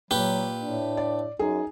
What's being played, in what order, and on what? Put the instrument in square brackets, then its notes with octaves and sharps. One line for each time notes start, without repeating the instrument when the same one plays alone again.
[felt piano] A#2 [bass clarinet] F#3 [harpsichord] G4 B4
[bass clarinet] A2 [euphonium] D4
[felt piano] D5
[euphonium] F#2 [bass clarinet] D#4 [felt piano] G#4